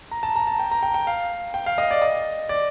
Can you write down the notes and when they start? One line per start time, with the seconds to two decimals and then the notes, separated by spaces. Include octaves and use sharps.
0.11 A#5
0.23 A5
0.36 A#5
0.47 A5
0.60 G5
0.71 A#5
0.83 G5
0.94 G5
1.07 F5
1.54 G5
1.66 F5
1.78 D#5
1.91 D5
2.02 D#5
2.49 D5